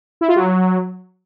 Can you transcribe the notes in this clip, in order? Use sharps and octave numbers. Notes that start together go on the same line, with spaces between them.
E4
F4
F#3